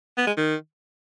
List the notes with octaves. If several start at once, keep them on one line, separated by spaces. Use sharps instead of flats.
B3
G#3
D#3